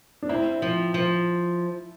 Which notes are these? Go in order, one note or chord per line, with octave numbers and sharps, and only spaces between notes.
D4
C4 E4
F3
F3